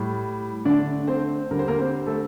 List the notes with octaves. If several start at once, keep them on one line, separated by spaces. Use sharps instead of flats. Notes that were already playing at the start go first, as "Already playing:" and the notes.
Already playing: A2 G3
D3 A3 D4 D5
C4 C5
D3 G3 A#4
C5
A#3 A#4
C4 C5
A3 A4